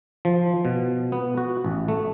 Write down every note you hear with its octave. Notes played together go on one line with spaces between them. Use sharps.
F3
B2
B3
F#4
A1
A3